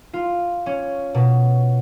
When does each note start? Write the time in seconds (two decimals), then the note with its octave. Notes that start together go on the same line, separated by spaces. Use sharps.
0.13 F4
0.66 C#4
1.15 B2